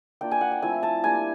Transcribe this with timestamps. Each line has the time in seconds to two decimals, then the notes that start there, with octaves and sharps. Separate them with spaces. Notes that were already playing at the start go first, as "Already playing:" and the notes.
0.21 A#3 D4 F4 G5
0.31 G#5
0.41 F#5
0.51 G5
0.62 F3 A3 C4 E4 G#5
0.83 A5
1.03 G3 A#3 D4 G#5